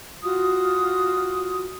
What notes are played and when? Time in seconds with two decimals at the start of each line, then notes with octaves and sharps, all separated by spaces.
0.23 F4 F#4 D#6